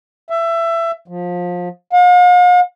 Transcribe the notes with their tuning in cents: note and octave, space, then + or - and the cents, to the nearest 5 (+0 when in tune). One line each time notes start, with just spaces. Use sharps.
E5 +20
F3 +25
F5 +45